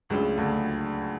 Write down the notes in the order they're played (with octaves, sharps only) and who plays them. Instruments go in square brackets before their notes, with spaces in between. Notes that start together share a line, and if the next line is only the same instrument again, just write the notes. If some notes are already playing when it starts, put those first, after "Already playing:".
[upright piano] C#2 C#3 [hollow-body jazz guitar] F#3 A3 D4 F4
[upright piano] D2 D3